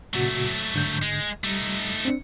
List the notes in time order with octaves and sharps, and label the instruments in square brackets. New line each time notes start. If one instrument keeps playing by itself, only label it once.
[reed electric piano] A#2 C#3 F#4 [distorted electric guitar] F#3 A3
[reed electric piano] G#2 D3 G6
[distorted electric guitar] G#3
[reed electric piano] G3 [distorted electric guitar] A3 D#4
[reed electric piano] C4 D4